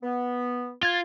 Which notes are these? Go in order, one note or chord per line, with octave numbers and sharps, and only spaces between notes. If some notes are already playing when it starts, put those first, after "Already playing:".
B3
F4 G#6 A6